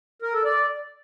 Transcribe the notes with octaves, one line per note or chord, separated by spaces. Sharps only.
A#4
A4
D5